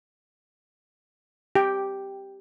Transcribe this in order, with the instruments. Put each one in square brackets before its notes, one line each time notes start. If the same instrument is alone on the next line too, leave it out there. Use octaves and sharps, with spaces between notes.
[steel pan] G4 G5